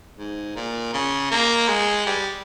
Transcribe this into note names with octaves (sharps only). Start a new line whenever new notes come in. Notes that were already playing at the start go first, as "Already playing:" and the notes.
G#2
A#2
C#3
A#3
G#3
G3